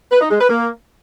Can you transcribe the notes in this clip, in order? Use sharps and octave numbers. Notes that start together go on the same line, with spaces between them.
B4
D#4
G#3
B4
A#3